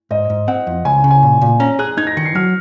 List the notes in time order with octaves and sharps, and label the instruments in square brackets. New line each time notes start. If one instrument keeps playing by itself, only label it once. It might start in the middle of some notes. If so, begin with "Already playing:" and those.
[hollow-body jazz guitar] G#2 [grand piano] D#5
[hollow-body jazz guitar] G#2
[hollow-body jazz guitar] C4 [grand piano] F#5
[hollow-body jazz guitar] F2
[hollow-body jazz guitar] C#2 [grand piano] G#5
[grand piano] G#5
[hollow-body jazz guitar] C#3
[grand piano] G#5
[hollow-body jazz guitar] A#2
A#2
[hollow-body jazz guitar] C#4 [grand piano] A#5
[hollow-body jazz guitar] G#4 [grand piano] F#6
[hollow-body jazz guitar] D#4 [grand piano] G#6
[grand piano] A#6
[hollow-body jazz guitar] D#3 [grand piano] C#7
[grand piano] C7
[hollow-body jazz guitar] F#3 [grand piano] F6